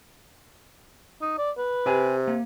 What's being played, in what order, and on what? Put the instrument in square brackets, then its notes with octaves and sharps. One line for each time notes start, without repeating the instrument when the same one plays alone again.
[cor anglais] D#4
D5
B4
[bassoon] C3 [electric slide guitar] G4 G#5
[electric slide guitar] A#3